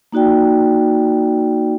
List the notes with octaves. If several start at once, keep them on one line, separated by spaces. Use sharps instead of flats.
A#3 D#4 F#4 D5 G5